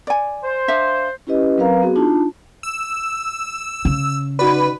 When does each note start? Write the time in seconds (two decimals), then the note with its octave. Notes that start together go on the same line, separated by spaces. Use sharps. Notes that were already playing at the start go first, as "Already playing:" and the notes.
0.07 D5 G#5
0.44 C5
0.68 D4 E5 F5
1.27 C#4 E4 G4 B4 D#5
1.57 F#3 C4 A#4 B4 F5 A#5
1.82 B3 F#4 G#4
1.95 D4 D#4 F4 A5
2.63 E6
3.85 C#3
4.39 D#4 F#4 B4 D5